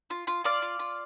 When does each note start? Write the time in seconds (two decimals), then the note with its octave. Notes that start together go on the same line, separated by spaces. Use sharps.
0.10 F4
0.27 F4
0.44 F4 D5 F5
0.62 F4
0.79 F4